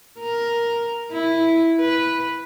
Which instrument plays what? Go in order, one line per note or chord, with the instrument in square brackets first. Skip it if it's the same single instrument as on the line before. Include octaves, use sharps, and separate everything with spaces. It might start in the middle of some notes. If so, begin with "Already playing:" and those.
[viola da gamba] A#4
E4
B4